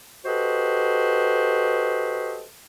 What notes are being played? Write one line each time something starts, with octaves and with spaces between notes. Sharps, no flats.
F#4 G4 A4 B4 C5 D#5